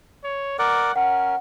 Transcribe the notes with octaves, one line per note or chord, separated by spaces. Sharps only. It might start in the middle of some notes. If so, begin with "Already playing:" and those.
C#5
A#4 D5 F#5 D6
C#4 A#4 F#5